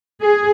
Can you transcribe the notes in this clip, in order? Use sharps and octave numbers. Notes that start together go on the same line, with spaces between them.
G#4